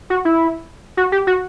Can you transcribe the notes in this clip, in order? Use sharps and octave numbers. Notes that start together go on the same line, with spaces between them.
F#4
E4
F#4
G4
F#4